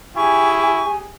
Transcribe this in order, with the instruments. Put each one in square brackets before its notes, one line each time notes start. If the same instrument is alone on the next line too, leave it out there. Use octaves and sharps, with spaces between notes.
[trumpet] E4 [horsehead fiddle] G4 G#4 [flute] G#5 [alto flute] C#6